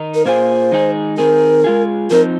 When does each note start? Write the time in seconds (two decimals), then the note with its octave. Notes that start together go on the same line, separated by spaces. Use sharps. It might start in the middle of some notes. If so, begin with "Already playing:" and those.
Already playing: D#3 D#4
0.15 A#4
0.26 A#2 A#3 F4 G#4 C5
0.72 D#3 G#3 D#4 G#4
1.18 D#3 C4 G#4 A#4
1.64 G#3 F4 G#4
2.11 F3 C4 D#4 A#4